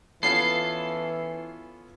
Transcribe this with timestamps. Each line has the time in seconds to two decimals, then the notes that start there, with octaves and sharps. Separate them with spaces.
0.23 E3 B3 C#4 F4 A4 C7